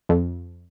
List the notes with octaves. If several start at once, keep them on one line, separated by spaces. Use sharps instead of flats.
F2